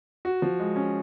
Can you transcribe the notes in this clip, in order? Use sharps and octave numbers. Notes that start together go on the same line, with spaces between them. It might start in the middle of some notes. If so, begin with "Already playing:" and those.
F#4
F3
G#3
C#4